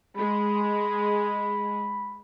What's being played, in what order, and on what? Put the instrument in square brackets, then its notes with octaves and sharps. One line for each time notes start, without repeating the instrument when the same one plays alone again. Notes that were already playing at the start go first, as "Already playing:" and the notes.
[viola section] G#3 [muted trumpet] B5